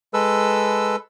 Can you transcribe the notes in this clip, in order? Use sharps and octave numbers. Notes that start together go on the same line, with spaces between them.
G#3 A4 B4 E6